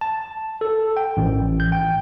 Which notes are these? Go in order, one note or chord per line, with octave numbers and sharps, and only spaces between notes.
A5
A4
G5
A1
G6
G5